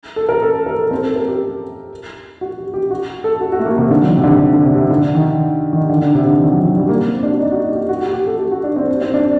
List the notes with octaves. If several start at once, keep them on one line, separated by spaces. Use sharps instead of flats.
A4
A#4
A4
A#4
A4
C4
A4
A#4
G4
F#4
G4
G4
F#4
A4
F#4
F#4
A3
A#3
C3
D3
F#3
D#3
C3
D3
D3
C3
C3
D3
D#3
D#3
D3
D3
C3
D3
D#3
F#3
F#3
G3
A#3
C4
D4
F#4
D#4
F#4
D#4
G4
F#4
F#4
G4
F#4
G4
A4
G4
F#4
D4
C4
C4
D4